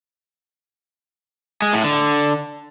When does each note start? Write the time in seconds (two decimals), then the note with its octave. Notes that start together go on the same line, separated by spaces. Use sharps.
1.62 G#3
1.73 A2
1.84 D3